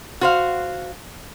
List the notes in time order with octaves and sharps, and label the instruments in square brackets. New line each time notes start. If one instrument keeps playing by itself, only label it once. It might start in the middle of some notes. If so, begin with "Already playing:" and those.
[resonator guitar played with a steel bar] F#4 C5 F5